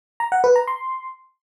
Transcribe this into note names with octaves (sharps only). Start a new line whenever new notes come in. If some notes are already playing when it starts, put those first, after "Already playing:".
A#5
F#5
B4
A#5
C6